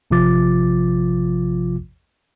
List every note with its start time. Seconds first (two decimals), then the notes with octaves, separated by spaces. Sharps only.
0.11 A1 C3 F3 F4 D6 A6